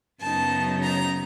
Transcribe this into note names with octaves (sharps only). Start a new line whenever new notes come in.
F#2 C#3 F#3 B3 D#4 A5
A#5